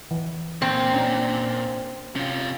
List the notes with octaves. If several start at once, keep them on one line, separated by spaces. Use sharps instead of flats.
E3
A#2 C4
C#4 D4
C3 C#4 F4